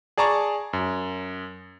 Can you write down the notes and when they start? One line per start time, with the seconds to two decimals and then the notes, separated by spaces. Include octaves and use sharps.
0.18 G#4 D5 A5 A#5 C#6
0.73 F#2